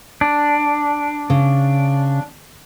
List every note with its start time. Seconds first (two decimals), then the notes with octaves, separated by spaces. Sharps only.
0.21 D4
1.30 C#3